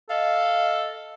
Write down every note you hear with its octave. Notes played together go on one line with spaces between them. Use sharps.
A4 D#5 F5